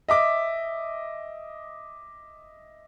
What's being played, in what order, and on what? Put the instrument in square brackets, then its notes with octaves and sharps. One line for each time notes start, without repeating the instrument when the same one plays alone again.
[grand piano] D#5 E5 D6